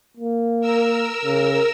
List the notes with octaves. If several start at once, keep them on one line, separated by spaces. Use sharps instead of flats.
A#3
A#4 E6
C#3